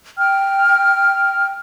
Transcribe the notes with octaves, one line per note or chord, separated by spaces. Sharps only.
G5 F6